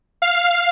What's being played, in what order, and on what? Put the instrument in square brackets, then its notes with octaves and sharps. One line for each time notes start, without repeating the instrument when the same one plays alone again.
[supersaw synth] F5